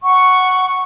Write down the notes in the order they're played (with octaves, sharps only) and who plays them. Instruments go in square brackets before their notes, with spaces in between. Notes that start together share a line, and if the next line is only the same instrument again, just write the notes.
[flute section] F#5 C#6